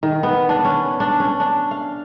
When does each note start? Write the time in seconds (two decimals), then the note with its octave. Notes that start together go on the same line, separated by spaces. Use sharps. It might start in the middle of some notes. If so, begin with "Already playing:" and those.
0.03 D#3
0.23 B3
0.49 D4
0.65 C#4
1.00 D4
1.20 C#4
1.40 D4
1.71 F5